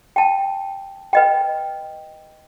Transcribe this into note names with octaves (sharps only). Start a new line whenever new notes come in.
G5 A5
B4 D#5 G5